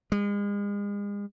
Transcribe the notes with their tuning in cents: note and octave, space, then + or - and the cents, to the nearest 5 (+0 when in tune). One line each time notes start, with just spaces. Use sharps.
G#3 -40